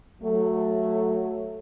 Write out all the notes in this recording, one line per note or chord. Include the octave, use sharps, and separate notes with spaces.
F#3 A3